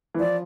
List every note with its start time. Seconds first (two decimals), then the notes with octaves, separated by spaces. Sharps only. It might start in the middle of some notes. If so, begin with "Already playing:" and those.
0.14 E3
0.19 F3 D5